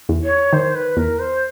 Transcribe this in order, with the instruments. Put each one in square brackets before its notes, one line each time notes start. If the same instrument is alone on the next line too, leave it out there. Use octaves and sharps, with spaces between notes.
[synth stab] E2
[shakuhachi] C#5
[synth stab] D#3 [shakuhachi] C5
[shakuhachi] B4
[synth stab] E2 [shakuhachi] A#4
[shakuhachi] C5